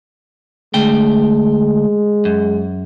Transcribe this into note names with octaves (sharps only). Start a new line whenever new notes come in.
D2 G#3 A3 G5
F#2